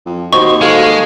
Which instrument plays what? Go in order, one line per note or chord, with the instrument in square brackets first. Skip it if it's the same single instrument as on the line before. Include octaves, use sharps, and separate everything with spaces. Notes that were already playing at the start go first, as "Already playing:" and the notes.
[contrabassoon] F2
[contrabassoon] D#2 [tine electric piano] F#4 C5 D#5 [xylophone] C#6
[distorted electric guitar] G#3 [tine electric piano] F#4 A4 F5